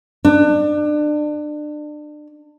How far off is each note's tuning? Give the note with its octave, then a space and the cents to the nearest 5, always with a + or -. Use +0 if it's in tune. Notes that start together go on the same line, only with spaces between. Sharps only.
D4 +30